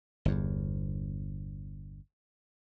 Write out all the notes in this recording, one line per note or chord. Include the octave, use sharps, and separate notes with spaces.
G1 E2